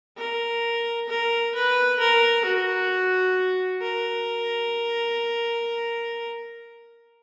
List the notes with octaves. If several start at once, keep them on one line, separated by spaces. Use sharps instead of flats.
A#4
A#4
B4
A#4
F#4
A#4